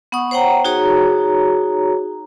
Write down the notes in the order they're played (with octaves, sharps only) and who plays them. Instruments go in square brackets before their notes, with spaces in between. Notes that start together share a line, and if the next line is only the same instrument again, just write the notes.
[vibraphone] B3 F#5 C#6 D#6
C5 C#5 F#5 G5 A#5
D#4 F#4 G#4 C#5 A#5